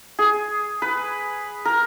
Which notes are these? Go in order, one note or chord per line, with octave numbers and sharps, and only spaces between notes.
G#4
B4
A#4